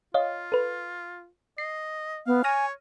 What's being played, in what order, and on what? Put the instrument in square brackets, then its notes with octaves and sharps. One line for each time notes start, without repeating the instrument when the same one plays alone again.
[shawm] F4 [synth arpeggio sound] C#5 D#5 F5
[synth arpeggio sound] A4 B4
[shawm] D#5 [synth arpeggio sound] C7
[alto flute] B3 [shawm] F5
[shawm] C#5 [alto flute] G#5 [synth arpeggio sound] F6 A#6 D#7